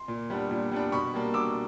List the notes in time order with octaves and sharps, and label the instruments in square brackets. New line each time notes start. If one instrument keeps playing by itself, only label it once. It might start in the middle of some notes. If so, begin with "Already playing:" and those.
Already playing: [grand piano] C6
A#2
G3 B3 D4
A#2
G3 B3 D4
B2 B5 C#6
G3 A#3 D4
B2 D6 E6